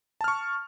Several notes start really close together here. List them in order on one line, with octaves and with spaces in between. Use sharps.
A5 F6 C#6